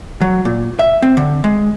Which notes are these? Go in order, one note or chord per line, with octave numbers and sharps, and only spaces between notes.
F#3
A#2
E5
C4
D3
G#3